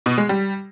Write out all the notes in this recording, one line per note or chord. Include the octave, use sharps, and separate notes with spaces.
B2
G#3
G3